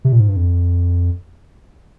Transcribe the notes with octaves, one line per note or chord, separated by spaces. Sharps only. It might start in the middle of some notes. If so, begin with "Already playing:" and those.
C3
A#2
G#2
G2
F2